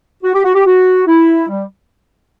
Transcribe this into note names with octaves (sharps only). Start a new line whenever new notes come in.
F#4
G4
F#4
G4
F#4
E4
G3